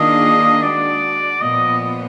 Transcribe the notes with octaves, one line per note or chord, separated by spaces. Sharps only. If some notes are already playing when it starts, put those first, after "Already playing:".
Already playing: D#3 A#3 D4 F4 G#4 D#5
G#3 D4 F#4 D5
A#2 F3 B3 D#5